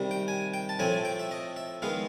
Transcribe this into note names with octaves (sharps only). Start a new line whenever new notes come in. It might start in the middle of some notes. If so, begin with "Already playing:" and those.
Already playing: C3 D#3 G3
G5
G#5
G5
A5
A2 F3 A3 C4 G#5
G5
E5
D#5
E5
D#3 G#3 B3 F5